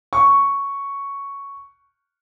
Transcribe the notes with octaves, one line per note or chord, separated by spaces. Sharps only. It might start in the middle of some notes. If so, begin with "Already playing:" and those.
C#6